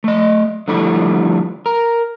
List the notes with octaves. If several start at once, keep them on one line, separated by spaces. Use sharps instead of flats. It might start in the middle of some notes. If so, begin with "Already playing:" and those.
A3 D#5
D3 F3 G3 A3 E4
A#4